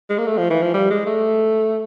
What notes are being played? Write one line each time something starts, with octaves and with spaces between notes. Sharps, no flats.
G#3
A#3
A3
F3
E3
F3
G3
G#3
A3